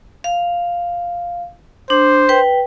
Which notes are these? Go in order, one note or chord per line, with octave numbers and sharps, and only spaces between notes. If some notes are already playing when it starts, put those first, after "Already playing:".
F5
D4 C5
B4 G5